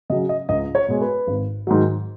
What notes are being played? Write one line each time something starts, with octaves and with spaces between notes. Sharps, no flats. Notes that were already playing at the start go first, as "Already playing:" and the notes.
C#3 F#3 D#5
D#5
C#2 D#5
C#5
B2 G#3
B4
G#1
G#2 D#3 F#3